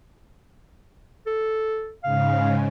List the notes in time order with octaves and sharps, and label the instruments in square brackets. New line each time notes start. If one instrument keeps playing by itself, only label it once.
[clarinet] A4
[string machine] G#2 C#3 [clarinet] F5